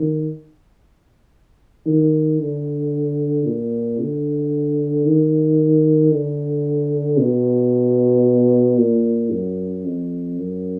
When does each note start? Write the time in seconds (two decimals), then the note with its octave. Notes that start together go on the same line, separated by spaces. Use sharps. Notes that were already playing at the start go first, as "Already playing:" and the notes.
Already playing: D#3
1.86 D#3
2.39 D3
3.46 A#2
3.99 D3
5.05 D#3
6.12 D3
7.18 B2
8.78 A#2
9.31 F#2
9.84 F2
10.38 F#2